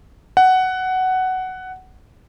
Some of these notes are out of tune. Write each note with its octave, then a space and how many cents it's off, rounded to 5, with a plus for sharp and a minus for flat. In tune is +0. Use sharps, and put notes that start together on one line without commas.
F#5 +10